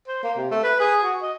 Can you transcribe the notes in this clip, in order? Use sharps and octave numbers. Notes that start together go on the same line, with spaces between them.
C5
A#3
C3
A3
B4
G#4
F#4
D#5